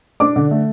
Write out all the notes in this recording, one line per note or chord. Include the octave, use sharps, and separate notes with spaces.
D4 D6
D3
A3